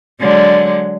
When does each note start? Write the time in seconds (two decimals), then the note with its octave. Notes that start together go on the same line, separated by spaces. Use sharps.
0.20 D3 F#3 G#3